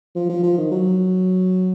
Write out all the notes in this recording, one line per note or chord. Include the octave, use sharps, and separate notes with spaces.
F3
F3
F3
D#3
F#3